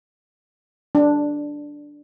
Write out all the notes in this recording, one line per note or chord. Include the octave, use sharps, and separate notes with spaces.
D4